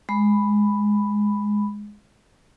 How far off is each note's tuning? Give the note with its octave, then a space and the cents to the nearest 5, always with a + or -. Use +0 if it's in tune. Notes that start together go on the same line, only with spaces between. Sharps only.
G#3 +0 B5 +0